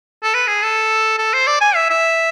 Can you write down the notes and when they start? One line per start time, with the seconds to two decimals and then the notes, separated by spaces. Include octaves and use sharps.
0.23 A4
0.34 B4
0.47 G#4
0.62 A4
1.18 A4
1.33 C5
1.47 D5
1.61 G#5
1.75 E5
1.90 E5